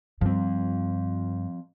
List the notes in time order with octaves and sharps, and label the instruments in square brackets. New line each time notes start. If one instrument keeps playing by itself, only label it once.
[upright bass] G2 [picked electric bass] F3 C4